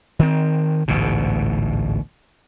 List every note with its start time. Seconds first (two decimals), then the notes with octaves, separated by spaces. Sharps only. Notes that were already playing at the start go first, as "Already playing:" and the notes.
0.19 D#3 C4
0.88 A1 D2 G#2 B2